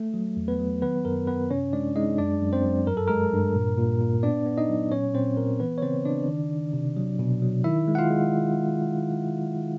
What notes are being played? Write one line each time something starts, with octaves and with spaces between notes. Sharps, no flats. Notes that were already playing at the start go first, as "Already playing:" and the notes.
Already playing: A3
F#3
E2
B3 B4
F#3
D#3 B3 B4
F#2 A#4
F#2 B3 B4
C3 C#4 C#5
G#3 D4 D5
G#3 D#4 D#5
F#2 D4 D5
F#2
C4 C5
F#3
G2 A#4
A4
G#3 A#4
G2
A#2
A#2
A#2
B3 D4 D5
B3
D#4 D#5
F#3
A#2 C#4 C#5
A#2 C4 C5
A#2 A#4
E3 B3 B4
C#5
C#3 C4 C5
C#3 D4 D5
D#3
D#3
C3
F#3
B2
F#3
D#3 E4 E5
G#3
F#5
F4 F5
G#3